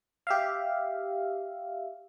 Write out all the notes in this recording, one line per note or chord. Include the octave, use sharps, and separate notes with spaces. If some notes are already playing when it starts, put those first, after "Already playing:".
G4 E5 F5